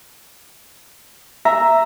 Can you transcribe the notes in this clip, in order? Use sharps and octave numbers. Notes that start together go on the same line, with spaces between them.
E5 A#5